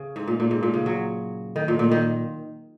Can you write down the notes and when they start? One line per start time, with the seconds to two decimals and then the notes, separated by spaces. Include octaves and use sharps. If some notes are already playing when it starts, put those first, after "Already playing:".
Already playing: C#3
0.16 G#2
0.28 A#2
0.40 A#2
0.51 G#2
0.63 A#2
0.74 C#3
0.86 F#3
1.56 D#3
1.68 A#2
1.79 A#2
1.91 D#3